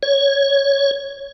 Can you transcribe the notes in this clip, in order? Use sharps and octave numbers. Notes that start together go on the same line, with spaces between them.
C#5